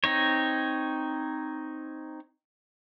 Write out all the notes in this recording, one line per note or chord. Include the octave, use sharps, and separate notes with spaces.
C4 D#4 C#5